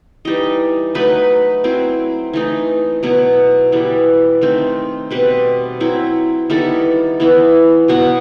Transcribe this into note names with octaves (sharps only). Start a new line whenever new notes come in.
E3 G3 D#4 D#5
F#3 A3 D#4 B4
F#3 C4 E4
E3 A3 D#4
B2 F#3 B3 E4
E3 G3 B3 E4
D#3 A3 C4
B2 G3 C4 B4
F#3 C4 E4
D#3 G3 B3 E4 A4
E3 B3 E4
B2 F#3 B3 F#4